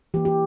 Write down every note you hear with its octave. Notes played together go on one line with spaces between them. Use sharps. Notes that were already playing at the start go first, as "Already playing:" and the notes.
E3 A#3 G4
G4